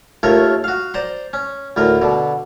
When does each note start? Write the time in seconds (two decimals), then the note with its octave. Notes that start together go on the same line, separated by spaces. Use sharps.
0.23 D#2 A3 F4 A#4 C#5
0.64 F#4 F5
0.94 C5 D5 A#5 C6
1.33 C#4
1.76 D2 A2 A#4
2.01 B2 D3